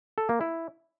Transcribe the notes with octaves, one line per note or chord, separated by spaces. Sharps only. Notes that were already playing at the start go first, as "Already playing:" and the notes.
A4
A#3
E4